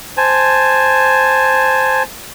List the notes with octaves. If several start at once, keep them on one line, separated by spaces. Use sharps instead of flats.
C5 G#5 A5